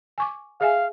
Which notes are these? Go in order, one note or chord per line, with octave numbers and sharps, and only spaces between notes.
G#5 C#6 D6
G#4 E5 F5 G#5